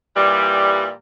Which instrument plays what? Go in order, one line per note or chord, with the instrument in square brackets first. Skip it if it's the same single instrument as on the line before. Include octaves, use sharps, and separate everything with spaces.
[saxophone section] A#2 E3 G3